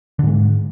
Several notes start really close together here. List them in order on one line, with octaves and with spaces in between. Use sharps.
D3 G#2 G#3